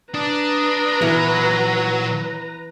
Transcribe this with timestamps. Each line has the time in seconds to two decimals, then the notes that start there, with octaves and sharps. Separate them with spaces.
0.14 D4 B4 A#5 D#6
1.01 A#2 E3 F#3 B3 A#4